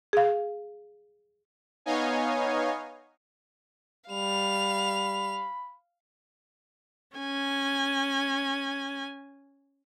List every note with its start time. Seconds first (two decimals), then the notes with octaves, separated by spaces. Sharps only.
0.13 G#4 F5
1.86 B3 D#4 C#5 D#5 F5 G#5
4.10 G3 F5 B5 F7
7.16 C#4 G#5